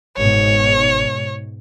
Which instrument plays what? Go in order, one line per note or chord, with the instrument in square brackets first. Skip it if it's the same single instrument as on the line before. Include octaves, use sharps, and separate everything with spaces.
[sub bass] G1 [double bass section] G#2 B2 [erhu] C#5